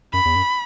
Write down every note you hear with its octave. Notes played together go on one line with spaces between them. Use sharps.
F#2 B5
E2
F#2